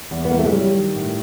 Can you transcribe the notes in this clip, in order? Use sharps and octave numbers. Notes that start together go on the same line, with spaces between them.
E2
B3
C3 A#3
A3
G#3
F#3 G3
D#3
A2